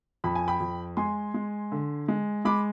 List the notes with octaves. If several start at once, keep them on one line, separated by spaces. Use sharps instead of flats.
F2 B5
G#5
G5 B5
F2
G#3 G#5 C6
G#3
D3
G#3
G#3 B5 D6